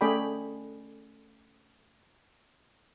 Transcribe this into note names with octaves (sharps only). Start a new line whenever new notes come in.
A3 C#4 G#4 D5 G5 B5